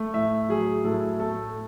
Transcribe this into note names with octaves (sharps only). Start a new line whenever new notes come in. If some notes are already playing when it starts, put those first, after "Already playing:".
Already playing: A3
A2 E5
F#3 G#4
A2 A4
A3 A4